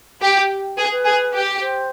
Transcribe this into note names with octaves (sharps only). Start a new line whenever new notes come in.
G4
G#4 B4
B4
G#4
G4
C5